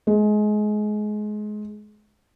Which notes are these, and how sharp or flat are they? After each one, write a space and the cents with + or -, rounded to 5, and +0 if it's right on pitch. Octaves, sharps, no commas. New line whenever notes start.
G#3 +25